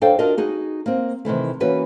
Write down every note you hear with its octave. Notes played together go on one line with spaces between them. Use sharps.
F#2 D4 A4 C5 F5 G5
D4 F4 F#4 A#4 D#5
D#4 F#4 G#4
A#3 C4
C3 D#3 E3 A3
E3 A#3 C#4 F#4 B4